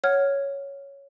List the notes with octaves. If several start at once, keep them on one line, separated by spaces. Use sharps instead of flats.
C#5 F#5 F6 G#6